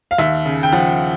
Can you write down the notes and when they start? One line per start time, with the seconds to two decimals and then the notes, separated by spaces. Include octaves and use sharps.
0.11 F5
0.18 D#2 E5
0.45 C#3
0.63 G5
0.72 F3 F#5